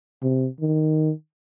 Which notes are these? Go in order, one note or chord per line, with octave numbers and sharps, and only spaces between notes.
C3
D#3